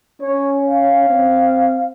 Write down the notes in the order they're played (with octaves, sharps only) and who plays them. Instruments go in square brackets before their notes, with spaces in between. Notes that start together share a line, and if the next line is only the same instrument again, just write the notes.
[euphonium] C#4 [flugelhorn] C#5
[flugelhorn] F5
[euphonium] C4